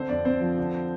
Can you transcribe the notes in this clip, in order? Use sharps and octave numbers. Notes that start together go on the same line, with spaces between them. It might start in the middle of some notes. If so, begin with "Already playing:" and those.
Already playing: D3 C4 C5
F2 D4 D5
F2 C4 C5
F3
D3